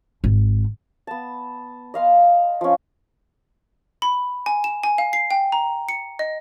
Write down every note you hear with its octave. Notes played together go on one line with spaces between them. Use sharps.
G#1
B3 A5
D#5 F5 C6
F3 C#4
B5
G#5
E7
G#5
F5
C7
G5
A#5
C#7
D#5